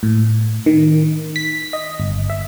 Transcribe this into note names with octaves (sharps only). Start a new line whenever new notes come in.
A2
D#3
B6
D#5
G1
E5